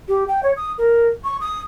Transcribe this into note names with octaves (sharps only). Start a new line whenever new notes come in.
G4
G5
C#5
D#6
A#4
C#6
D#6